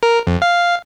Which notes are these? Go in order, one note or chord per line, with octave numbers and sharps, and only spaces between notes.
A#4
F2
F5